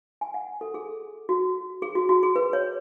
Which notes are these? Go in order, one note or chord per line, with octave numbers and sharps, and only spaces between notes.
G#5
F#5
A4
G#4
F#4
G#4
F#4
F#4
G#4
B4
C#5